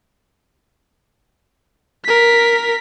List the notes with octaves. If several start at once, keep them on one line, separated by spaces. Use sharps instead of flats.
A#4 B6